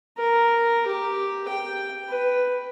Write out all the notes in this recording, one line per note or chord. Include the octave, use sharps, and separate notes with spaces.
A#4
G4
G5
B4